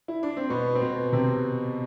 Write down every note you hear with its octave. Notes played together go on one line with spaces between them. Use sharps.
E4
D4
C4
B2 B3
C4
B2 B3
C3 C4